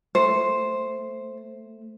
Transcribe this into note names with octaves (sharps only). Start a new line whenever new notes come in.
A3 C5